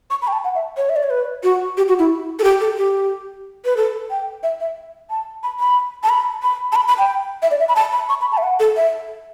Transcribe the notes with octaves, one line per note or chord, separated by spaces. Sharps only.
C#6
B5
G5
A5
F#5
E5
C#5
E5
D5
C#5
B4
F#4
G4
F#4
E4
A4
G4
A4
G4
B4
A4
G5
E5
E5
A5
B5
B5
A5
B5
B5
A5
B5
B5
G5
E5
D5
E5
B5
A5
B5
C#6
B5
A5
E5
F#5
A4
E5